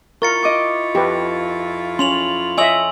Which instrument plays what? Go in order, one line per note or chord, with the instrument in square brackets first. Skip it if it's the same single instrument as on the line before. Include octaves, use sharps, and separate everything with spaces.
[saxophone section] E4 F4 [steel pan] A#4 [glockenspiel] C#6 A6 C#7
[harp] D#5 D6
[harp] F2 [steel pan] G4 B4
[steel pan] C#4 [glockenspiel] C6 F7 F#7
[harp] C#5 [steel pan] D#5 E5 [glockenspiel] G#5 E6 F#7